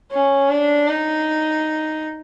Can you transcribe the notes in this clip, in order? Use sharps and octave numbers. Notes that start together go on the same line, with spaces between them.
C#4
D4
D#4